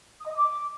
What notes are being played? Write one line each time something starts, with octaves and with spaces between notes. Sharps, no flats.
D#6
D#5
D#6
D6